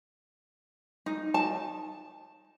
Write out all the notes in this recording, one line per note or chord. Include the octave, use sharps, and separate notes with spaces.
D#4
A5